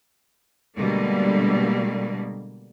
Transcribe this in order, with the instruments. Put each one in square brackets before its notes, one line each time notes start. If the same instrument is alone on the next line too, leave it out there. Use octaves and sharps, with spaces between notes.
[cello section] B2 D3 G3 G#3 A#3